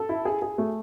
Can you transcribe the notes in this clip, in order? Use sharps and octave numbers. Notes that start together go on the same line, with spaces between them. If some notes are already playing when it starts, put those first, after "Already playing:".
Already playing: A4
E4
G#4
G#4
A3